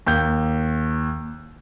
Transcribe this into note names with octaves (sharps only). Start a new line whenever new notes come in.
D#2 G6